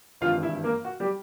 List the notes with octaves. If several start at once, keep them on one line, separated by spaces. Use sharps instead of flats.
G#1 G2 E3 F4 F5
E4 E5
A#3 A#4
F#4
G3 G4